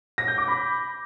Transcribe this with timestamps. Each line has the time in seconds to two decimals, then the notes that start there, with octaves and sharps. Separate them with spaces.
0.18 A#6
0.28 G6
0.38 D6
0.48 B5